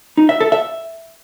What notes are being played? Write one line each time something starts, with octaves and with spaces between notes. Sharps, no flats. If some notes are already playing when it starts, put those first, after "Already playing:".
D#4
E5
A4
E5